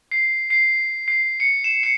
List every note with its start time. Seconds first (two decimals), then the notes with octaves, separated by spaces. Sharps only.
0.12 C7
0.50 C7
1.08 C7
1.40 C#7
1.64 E7
1.83 C#7